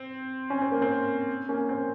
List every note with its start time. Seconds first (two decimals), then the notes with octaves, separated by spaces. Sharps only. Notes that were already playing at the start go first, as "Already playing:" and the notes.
Already playing: C4
0.50 C#4
0.62 C4
0.71 A#3
0.82 C4
1.49 A#3 C#4
1.69 C4